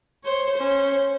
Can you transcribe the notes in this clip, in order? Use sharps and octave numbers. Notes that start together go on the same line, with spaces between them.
C5 C#5
C#4 C5